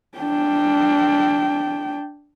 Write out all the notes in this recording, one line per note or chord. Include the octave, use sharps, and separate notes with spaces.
D4 G5